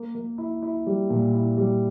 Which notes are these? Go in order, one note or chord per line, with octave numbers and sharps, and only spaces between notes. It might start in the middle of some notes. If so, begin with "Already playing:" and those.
Already playing: A#3
A#3
E4
E4
G3
A#2
E4
G3